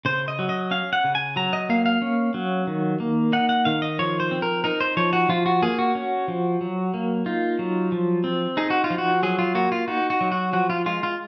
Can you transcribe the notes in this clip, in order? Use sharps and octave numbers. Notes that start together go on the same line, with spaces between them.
C#3 C5
D#5
F#3
D#5
C#4 F5
F#5
C#3
G#5
F#3 A#5
D#5
A#3 F5
F5
C#4
F#3
D#3
A#3
D#4 F#5
F#5
D#3 F5
D#5
F3 C#5
C5
C4
A#4
D#4 A#4
C5
F3 C#5
F#4
F3 F4
F#4
A#3 G#4
F#4
C#4
F3
F#3
A#3
D#4 F4
F#3
F3
C4
D#4 G#4
F#4
F4
F3
F#4
F#3 G#4
F4
A#3 F#4
F4
D#4 F#4
F#4
F#3
F#4
F3 F#4
F4
G#3 F4
F4